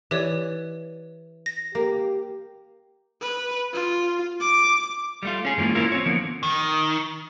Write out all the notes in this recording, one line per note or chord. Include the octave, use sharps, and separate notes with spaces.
E3 G4 C#5 D5
A#6
A#3 G4
B4
F4
D6
G3 A3 F4
C#4 G#4
G2 E3 G#3 A#3 F4
A3 A#3 C#4 E4 F4 A#4
C4 C#5
D3 E3 F3 A#3 B3
D#3